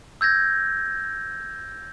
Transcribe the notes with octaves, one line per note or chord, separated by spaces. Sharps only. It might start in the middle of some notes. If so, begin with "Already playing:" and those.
E6 G6 G#6 A#6